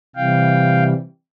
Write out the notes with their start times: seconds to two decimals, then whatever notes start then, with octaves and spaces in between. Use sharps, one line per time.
0.16 C3 E3 G3 F5 G5